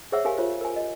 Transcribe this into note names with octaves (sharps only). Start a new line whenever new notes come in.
G#4 C5 C#5 E5 F#5 E6
G4 A#4 F5 G#5
F4 C5 C#5
A#4 G#5
D#5